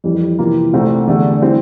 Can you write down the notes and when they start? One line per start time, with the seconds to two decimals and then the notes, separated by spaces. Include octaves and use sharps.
0.04 F2 E3 G3
0.39 C3 E3 A#3 F4 A#4
0.73 C2 A#2 A3 C4
1.07 E2 D3 A3 D4 G4
1.41 E3 G3 C4